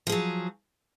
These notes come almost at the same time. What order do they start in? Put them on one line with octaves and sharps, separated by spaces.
F3 G#4 F#3